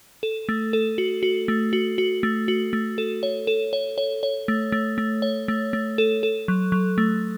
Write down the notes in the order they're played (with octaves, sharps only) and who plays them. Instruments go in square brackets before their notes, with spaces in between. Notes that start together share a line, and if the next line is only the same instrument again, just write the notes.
[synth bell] A4
A3
A4
F#4
F#4
A3
F#4
F#4
A3
F#4
A3
A4
C#5
A4
C#5
C#5
C#5
A3
A3
A3
C#5
A3
A3
A4
A4
F#3
F#3
A3